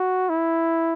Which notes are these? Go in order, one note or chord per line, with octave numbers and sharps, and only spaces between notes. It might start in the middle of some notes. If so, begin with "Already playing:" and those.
Already playing: F#4
E4